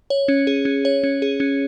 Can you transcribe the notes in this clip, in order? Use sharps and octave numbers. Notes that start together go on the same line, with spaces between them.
C#5
C#4
G#4
C#4
C#5
C#4
G#4
C#4